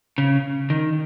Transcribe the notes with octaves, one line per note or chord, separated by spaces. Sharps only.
C#3
D#3